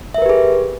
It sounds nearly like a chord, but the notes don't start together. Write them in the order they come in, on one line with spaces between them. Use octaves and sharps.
E5 A#4 B4 G4 G#4